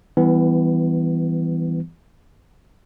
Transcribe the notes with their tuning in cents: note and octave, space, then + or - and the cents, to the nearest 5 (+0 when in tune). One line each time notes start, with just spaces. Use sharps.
E3 +0 G3 +0 B3 +30